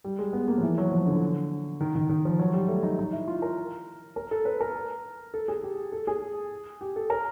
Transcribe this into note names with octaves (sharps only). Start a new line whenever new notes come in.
G3
G#3
B3
A#3
F3
E3
F#3
F3
D3
D#3
D#3
D#3
F3
F#3
G3
A3
D#4
D#4
E4
F4
A#4
A#4
A4
B4
A#4
A4
G#4
G4
A4
G#4
G4
A4
A#4